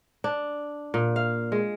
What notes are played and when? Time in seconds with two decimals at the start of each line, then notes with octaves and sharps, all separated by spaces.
0.24 D4
0.94 A#2
1.16 F5
1.52 G#3